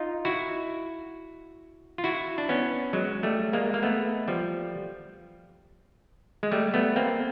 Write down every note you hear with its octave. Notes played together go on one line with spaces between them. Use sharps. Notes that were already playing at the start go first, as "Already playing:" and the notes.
Already playing: D#4 F4
E4 F#4
F4
E4 F#4
D4
B3 C#4
F#3 G#3
G3 A3
G#3 A#3
A#3
A3 B3
F3 G3
G#3
G3 A3
A3 B3
A#3 C4